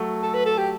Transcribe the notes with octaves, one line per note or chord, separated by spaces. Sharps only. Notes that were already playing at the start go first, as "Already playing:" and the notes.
Already playing: F#3 A3
A4
B4
A4
G4